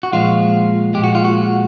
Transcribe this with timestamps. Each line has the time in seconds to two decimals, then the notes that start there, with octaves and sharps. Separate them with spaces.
0.03 F#4
0.13 A#2 F3 G#3 F4
0.94 A#2 F3 G#3 G4
1.04 F#4
1.15 F4
1.25 F#4